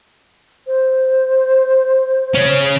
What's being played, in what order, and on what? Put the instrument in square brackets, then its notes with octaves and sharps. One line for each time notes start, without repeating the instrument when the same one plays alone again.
[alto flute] C5
[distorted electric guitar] C#3 C#4